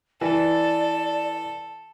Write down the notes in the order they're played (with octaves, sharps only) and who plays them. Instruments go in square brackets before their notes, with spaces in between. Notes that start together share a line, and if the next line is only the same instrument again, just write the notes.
[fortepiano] E3 [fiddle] A4 [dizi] D5